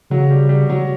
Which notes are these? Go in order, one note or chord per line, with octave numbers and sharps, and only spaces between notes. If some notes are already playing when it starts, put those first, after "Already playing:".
C#3 F#3
G3
G3
F#3